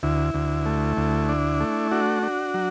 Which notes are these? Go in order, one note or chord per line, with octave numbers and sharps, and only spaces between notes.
D2 E4
D2
A3
D2
D4
A3
D4 F#4
D4
F#3